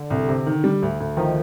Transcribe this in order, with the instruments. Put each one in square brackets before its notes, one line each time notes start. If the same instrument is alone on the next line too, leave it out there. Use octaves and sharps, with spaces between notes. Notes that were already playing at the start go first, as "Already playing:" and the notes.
Already playing: [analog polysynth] D3
[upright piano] C2
C3
D#3
G3
D2
D2
[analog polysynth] D#3 [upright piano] F3